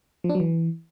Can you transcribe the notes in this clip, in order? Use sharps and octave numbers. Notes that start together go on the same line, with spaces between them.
F3
D4
F#3
E3